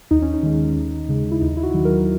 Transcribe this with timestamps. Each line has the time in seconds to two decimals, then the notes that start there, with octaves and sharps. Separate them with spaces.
0.11 D#2 D#4
0.22 C#4
0.34 D#4
0.43 D#3 G#3
0.76 D#2
1.09 C#3 G#3
1.31 E4
1.41 D#2 D#4
1.57 E4
1.63 F#4
1.74 D#3 F#3
1.85 A#4